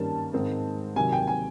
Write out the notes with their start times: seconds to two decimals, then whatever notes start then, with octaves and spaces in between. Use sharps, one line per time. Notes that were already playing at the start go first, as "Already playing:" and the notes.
Already playing: G2 D#3 G3 A#3 C#4 A5
0.33 G#2 D#3 G#3 C4
0.96 C3 D#3 F#3 G#5
1.13 G5
1.28 G#5